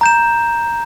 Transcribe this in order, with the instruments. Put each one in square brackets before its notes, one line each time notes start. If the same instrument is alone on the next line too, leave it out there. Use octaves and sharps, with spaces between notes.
[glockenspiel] A#5 G6 E7